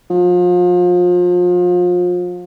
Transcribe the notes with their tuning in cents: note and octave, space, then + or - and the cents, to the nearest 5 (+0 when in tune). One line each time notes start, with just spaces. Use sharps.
F3 +30